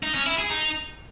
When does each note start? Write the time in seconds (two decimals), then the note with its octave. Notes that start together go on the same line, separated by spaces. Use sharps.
0.03 D#4
0.15 C#4
0.27 E4
0.38 G#4
0.50 D#4